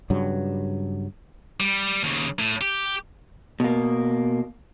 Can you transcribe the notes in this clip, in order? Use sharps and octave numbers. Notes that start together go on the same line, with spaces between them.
G2 C#3 F#3
G3
D#2 C#3
A2
G4
B2 A#3